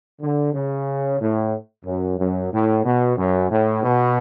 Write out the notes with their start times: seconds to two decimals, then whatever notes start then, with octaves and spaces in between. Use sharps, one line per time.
0.21 D3
0.54 C#3
1.20 A2
1.85 F#2
2.18 F#2
2.52 A2
2.84 B2
3.17 F#2
3.50 A2
3.83 B2